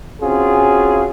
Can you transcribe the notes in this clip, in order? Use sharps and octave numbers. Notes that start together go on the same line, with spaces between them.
C4 C#4 F4 F#4 G#4